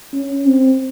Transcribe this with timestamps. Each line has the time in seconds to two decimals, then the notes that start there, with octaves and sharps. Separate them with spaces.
0.14 C#4
0.46 C4